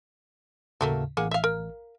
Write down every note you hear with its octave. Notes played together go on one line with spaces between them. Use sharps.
D#2 A2 C#3 F#3 A3 A#3
A1 A#3 G#4 F#5
E5 F5
A#4